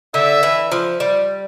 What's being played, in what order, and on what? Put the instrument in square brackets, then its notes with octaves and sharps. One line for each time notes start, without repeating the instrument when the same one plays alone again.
[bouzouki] D3 [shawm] E5
[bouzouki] E3
F3
G3